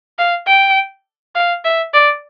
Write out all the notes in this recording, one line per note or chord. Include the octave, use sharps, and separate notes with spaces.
F5
G5
F5
E5
D5